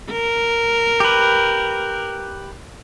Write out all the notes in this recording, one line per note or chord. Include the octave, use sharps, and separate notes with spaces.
A#4
G4 B4